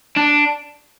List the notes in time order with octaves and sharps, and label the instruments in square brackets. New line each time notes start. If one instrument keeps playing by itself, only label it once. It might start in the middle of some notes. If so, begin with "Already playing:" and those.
[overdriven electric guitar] D4